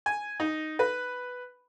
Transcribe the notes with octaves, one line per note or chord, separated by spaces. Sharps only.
G#5
D#4
B4